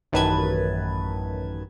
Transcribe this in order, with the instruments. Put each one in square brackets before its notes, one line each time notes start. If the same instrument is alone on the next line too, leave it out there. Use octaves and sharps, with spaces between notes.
[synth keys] A1 F#2 D#3 B4 A5 G#6